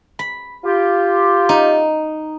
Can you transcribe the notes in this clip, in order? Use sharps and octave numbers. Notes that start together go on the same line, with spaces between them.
B5
F4 G4
D#4